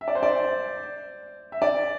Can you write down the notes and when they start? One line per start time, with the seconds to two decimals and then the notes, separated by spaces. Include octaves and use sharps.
0.01 E5
0.08 D5
0.15 C5
0.23 D5
1.52 E5
1.62 D5